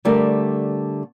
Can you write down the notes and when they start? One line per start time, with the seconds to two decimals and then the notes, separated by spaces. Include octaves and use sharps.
0.05 D3 G3 A3 A#4